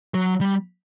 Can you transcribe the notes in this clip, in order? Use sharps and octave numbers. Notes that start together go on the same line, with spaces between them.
F#3
G3